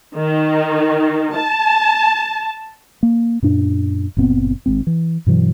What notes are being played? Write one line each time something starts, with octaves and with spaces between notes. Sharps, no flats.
D#3
A5
A#3
F#2 A#2 D4
F#1 A#2 B3 C4
G#1 G#2 C4
E3
G2 B2 E3 F#3